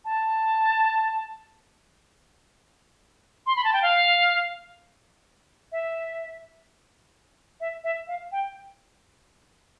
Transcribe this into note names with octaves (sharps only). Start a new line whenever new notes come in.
A5
C6
B5
A5
G5
F5
E5
E5
E5
F5
G5